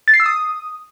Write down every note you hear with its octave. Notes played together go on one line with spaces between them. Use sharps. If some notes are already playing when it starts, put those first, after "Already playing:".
A6
C7
E6
D#6